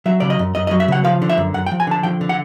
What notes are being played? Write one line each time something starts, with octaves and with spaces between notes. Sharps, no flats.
F#3 E5
C#3 D5
D#5
F#2
F#2 D#5
D#5
F#3
E5
C#3 F#5
F3 F5
D3
E5
F#2
F#2 F#5
G5
F3
G#5
D3 A5
F3 G5
D3
F#5